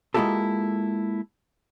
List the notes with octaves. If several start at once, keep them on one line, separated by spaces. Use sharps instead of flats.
G#3 A#3 E4 F4 G4 A4